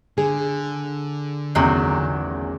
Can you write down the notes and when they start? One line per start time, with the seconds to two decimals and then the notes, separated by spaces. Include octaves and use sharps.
0.18 D3 G#4
1.55 A1 E2 C3 D#3 F#3